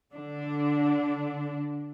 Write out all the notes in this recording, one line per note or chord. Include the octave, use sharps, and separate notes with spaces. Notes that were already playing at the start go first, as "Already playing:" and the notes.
D3 D4